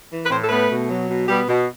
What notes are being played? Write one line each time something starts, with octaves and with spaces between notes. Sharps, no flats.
E3
B4
A2 C4 C5
A4
A3 B3 B4
B2
F#3
B2
G3 B3 G4
B2